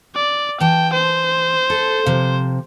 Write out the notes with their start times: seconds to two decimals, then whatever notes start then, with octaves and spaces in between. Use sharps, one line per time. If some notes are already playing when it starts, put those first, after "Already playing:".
0.15 D5
0.60 E3 G5 A5
0.93 C5
1.70 A4
2.06 C3 F3